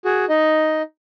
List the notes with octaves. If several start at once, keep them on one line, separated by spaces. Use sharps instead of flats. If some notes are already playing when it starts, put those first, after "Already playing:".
F#4 G#4
D#4 D#5